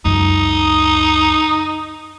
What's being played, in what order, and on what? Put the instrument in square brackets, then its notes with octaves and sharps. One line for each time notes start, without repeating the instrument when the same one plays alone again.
[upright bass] C#2 F#2 [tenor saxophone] D#4